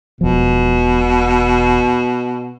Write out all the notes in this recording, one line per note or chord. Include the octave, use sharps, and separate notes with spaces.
E1 B2 F3